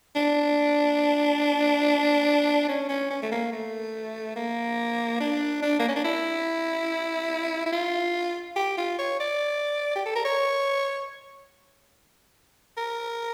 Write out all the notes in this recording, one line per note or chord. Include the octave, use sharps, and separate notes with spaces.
D4
C#4
C#4
C#4
A3
A#3
A3
A#3
D4
D4
A#3
C#4
D4
E4
E4
F4
G4
F4
C#5
D5
G4
A4
A#4
C#5
A#4